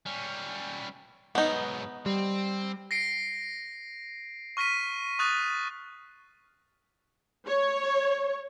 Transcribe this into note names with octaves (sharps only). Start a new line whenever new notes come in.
G3 C#4
G#2 F#3 B3 D#4
G3 C4
A#6 C7 D7
C#6 F6 A#6 B6 D#7
C#6 D#6 F#6 A6
C#5